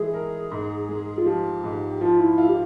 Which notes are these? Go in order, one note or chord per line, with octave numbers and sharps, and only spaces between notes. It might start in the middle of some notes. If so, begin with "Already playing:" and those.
Already playing: E3 G#3 E4 G#4
A#4
G#2
G#3
F4
F3 G4
G#2
G4
F3 F4
E4
E4 F4
G4